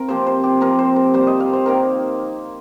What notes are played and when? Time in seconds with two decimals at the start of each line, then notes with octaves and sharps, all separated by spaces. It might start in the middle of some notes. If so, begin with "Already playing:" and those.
Already playing: C4 A#4 F5
0.08 C3 F3 A#3 C5
0.27 C5
0.44 G4
0.61 C3 F3 A#3 A#4
0.79 C5
0.96 A#4
1.14 C3 G3 A#3 C5
1.27 D#5
1.40 F5
1.53 C5
1.66 D#3 A#3 A#4